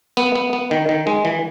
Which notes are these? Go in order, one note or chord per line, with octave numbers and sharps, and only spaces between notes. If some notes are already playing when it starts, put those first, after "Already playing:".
B3
B3
B3
D#3
D#3
G#3
E3